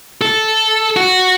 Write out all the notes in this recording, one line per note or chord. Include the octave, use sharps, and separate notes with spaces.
A4
F#4